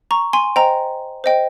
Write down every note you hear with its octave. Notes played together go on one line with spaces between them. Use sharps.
A#5 C#6
G#5 C6
C5 D#5 G5 A#5
C5 D#5 G5